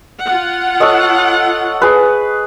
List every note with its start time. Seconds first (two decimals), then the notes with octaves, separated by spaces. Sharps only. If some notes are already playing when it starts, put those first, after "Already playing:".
0.24 F4 F#5
0.80 A4 C#5 D#5
1.82 G#4 B4